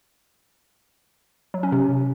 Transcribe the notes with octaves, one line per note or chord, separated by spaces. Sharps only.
F#3
C#4
C3